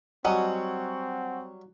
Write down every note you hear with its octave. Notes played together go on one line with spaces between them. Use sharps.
F#3 G3 C4 D#5 F#5 G#5 C#6